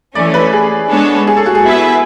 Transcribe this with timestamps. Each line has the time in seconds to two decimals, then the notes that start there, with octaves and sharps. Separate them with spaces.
0.15 E3 A3 C#4 D5
0.34 B4
0.53 G#4
0.89 G#3 B3 D4 A4 C#5
1.27 G#4
1.37 A4
1.46 F#4
1.55 G#4
1.64 B3 E4 B4 E5